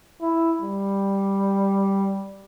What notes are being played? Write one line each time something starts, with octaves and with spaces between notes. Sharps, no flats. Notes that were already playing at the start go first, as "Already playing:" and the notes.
E4
G3